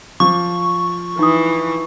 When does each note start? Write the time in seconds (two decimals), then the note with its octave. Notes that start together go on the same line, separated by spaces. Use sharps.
0.20 F3 C#6 D6
1.19 E3 D#4 D#6